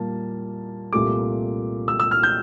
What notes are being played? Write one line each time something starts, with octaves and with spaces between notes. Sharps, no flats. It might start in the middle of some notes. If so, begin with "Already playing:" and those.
Already playing: A#2 G3 A#3 A5
C2 A#2 A3 D6
E6
E6
F6
G6